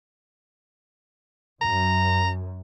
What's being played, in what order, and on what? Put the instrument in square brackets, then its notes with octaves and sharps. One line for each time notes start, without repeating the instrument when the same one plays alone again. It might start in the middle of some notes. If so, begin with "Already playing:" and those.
[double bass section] F#2 [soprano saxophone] A#5